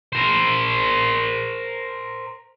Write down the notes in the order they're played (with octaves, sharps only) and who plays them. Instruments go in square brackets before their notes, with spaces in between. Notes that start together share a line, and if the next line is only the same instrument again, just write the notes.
[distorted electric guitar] A#4 C5